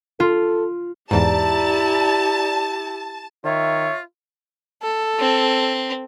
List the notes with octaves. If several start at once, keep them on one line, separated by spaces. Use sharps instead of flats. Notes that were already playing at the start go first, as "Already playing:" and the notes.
F4 A4
E2 G#2 E4 G4 D5 A5 A#5
D#3 F4 C#5 E5
A4
C4